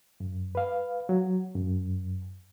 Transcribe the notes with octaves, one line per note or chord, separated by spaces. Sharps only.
F#2
B4 F5
F#3
F#2